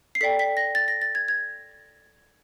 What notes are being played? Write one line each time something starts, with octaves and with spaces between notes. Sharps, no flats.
C7
A4 D5 G5 B6
B6
A#6
A6
A#6
A6
G#6
G#6